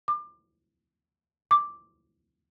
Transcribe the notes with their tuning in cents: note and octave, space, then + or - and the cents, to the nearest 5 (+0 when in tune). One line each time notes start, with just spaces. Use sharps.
D6 +25
D6 +0